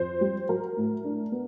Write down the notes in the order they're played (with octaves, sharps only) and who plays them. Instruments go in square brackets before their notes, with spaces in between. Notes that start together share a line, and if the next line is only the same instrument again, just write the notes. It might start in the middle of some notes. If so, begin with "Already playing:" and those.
Already playing: [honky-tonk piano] F2 C5
G3
F#3 A#4
A2
D4
B3